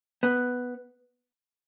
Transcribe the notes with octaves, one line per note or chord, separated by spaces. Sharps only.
B3